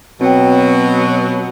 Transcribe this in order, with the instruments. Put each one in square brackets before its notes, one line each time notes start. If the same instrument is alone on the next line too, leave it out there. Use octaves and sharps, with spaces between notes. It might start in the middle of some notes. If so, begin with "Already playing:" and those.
[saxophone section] B2 F#3 [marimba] C4 G5